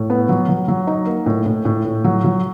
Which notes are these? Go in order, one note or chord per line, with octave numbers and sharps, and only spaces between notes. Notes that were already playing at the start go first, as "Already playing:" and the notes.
Already playing: A2
B3
F#3
F#3
F#3
D#4
A#3
A2
A2
A2
A2
F#3
F#3